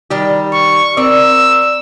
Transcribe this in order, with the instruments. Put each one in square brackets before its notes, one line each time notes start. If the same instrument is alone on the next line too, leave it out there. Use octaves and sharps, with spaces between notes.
[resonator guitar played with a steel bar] D#3 G3 G4
[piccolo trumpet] C#6
[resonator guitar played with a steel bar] C4 A#4 D5 [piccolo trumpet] E6